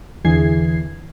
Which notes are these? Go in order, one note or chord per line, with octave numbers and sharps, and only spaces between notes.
E2 D3 E3 G#4 G#6 C7